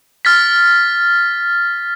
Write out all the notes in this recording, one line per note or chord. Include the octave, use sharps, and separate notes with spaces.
F6 A6 B6